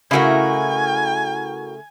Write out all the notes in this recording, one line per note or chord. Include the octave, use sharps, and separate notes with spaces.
C#3 A3 E4 F#4 A#4 G#5